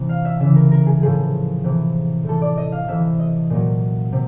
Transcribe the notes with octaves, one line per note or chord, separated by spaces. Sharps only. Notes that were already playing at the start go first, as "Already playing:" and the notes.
Already playing: C3 E3
F5
E5
C#3 E3 E5
A#4
A#4
G#4
A2 F3 G#4
C3 E3
A2 E3 A4
D5
D#5
F5
C3 E3 E5
D#5
A#2 F#3
C3